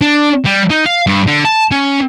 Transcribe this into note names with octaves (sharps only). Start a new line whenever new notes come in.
D4
G3
D#4
F5
G2
D3
A5
C#4